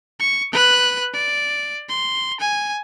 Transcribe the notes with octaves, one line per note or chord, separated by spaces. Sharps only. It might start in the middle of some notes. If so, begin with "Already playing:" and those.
C#6
B4 F#6
D5
C6
G#5